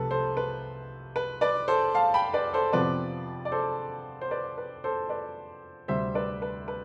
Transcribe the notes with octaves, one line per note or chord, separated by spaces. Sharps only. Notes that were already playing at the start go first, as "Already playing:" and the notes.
Already playing: C2 C3 F3 A3 A4 B4
A4 C5
B4
B4
B4 D5
A4 C5
F5 A5
G5 B5
B4 D5
A4 C5
F2 C3 F3 B3 B4 D5
D5
A4 C5
C5
B4 D5
B4
A4 C5
B4 D5
D2 C3 G3 C4 C5 E5
B4 D5
B4
B4